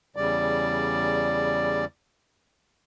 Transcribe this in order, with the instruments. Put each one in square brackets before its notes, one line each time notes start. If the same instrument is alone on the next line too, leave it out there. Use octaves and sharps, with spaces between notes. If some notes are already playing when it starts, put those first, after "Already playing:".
[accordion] E2 C#3 G3 D5